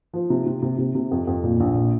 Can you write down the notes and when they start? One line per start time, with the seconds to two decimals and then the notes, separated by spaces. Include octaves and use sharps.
0.13 F3
0.30 C3
0.46 C3
0.62 C3
0.78 C3
0.95 C3
1.11 F2
1.27 F2
1.44 A#2
1.60 A#1
1.76 A#2